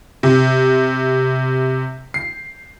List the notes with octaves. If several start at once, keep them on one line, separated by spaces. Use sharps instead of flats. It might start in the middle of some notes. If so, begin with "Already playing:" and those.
C3
C7